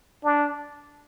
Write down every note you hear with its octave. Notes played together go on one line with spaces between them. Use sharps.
D4